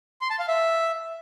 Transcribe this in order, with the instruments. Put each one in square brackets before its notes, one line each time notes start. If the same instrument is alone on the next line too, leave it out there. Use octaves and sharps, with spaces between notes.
[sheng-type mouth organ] C6
A5
F5
E5